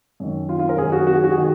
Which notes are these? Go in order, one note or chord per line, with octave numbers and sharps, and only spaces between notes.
F#2 D#3
F4
F4
A#4
F#2 D#3 G#4
F#4
F#4
G#4
F#4
G#4
D#3 F#4